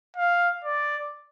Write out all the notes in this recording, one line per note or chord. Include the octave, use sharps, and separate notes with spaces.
F5
D5